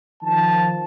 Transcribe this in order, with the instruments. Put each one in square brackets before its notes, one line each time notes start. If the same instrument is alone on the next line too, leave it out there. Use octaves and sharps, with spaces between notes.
[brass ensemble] D#3 F3 A5